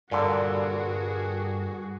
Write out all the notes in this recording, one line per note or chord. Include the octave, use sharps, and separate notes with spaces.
G2 A#2 D3 F#4 G#4